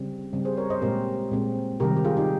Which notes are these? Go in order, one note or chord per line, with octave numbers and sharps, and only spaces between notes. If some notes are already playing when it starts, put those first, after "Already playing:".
Already playing: C#3 G3 C4
C#3 G3 C4
G#4 C5
A#4 C#5
C5 D#5
A#2 G#3 C4 G4 A#4
A#2 G#3 C4
C3 D#3 G3 G4 A#4
G4
F4 G#4
D#4 G4